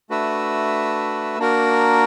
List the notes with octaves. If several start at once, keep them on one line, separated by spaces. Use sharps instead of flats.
A3 D4 F#4 B4 E5
A#3 D4 F#4 A#4